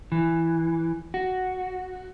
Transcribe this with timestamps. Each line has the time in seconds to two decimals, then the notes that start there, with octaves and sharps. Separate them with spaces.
0.12 E3
1.14 F#4